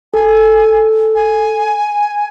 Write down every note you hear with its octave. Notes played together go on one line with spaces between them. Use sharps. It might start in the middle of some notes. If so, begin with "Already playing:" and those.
A4 G#5
G#5